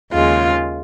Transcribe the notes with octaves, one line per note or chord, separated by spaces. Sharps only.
D#2 C#3 G#3 F4